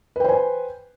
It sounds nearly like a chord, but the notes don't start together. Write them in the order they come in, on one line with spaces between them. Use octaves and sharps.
B4 G5 C5 G#5